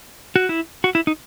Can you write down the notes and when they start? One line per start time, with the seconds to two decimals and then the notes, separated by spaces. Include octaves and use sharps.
0.36 F#4
0.49 E4
0.84 F#4
0.95 E4
1.07 D#4